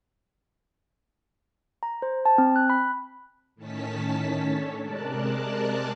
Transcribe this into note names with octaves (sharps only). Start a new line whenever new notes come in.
A#5
C5
A5
C4
F#6
B5
A2 D#3 C#4 A5 B6
D4 A4 C#5
C3 G#3 A#4 D5 A5 F#6